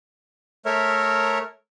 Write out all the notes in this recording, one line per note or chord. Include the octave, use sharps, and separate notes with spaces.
A3 A#4 C#5 E5